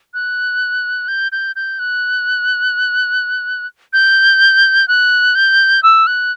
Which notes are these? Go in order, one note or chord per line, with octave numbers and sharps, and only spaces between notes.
F#6
G6
G6
G6
F#6
G6
F#6
G6
E6
F#6